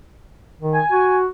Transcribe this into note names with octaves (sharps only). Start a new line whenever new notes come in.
D#3
G#5
F#4